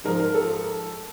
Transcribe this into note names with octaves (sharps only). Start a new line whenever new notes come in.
G#2 F3 A#4
A#4
A4